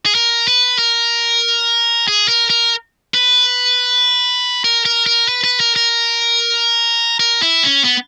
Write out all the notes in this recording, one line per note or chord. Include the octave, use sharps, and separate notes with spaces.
G#4
A#4
B4
A#4
G#4
A#4
A#4
B4
A#4
A#4
A#4
B4
B4
A#4
A#4
A#4
E4
C#4
B3